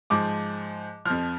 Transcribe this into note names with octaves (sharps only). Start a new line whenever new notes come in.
G#2 F3 D6
F2 F3 F6